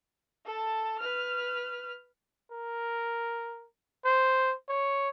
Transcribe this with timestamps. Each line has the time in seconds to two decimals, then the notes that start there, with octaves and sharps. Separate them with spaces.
0.46 A4 A5
0.99 B4 F6
2.51 A#4
4.05 C5
4.69 C#5